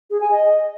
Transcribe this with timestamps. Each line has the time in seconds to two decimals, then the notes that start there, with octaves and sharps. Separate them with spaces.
0.10 G#4
0.21 G#5
0.31 D#5